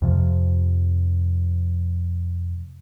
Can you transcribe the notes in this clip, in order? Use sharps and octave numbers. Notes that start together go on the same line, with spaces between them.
F2 C3 F3